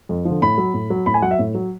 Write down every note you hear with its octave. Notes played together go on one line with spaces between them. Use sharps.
F2
D3 F3
A2 B5
F#3
A2
F#3
A2 B5
G#5
F#3 F#5
E5
A2
F#3